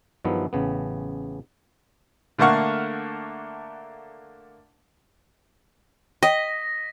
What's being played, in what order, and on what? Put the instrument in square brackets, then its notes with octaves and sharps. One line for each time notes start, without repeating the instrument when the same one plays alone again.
[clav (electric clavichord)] G2 D#3 F3 F#3 B3 E4
A1 C#3 B3
[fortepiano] D3 A3 A#3 F#5 C#6 F6
[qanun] D#5 [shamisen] G5 [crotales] A#6 B6